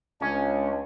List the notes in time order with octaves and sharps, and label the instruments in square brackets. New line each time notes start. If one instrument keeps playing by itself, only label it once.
[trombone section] C#2 [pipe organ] G#3 D4 [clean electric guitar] C#4